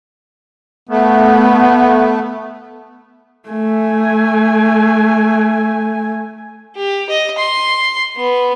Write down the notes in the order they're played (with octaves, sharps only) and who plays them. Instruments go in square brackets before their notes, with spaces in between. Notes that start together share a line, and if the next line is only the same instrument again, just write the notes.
[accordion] A3 [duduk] B3
[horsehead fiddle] A3 G#5
[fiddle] G4
D#5
C6
B3